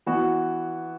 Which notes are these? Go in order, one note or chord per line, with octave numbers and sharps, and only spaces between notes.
E3 B3 F#4